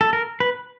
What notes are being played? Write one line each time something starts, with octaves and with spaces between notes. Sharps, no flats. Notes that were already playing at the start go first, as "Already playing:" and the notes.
A4
A#4
B4